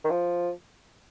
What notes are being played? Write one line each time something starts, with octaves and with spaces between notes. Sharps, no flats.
D#3
F3